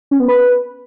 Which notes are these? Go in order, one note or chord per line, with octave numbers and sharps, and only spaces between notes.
C#4
B3
B4